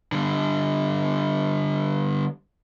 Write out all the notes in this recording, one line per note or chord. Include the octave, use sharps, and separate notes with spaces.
D3 G3